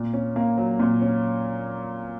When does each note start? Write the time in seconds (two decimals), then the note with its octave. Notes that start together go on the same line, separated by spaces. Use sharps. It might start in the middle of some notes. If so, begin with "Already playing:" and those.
Already playing: A#2
0.14 C#4
0.36 A#3
0.58 F#3
0.79 A#2
1.01 C#4